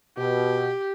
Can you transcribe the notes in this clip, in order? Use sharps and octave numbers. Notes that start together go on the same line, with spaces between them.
B2 G4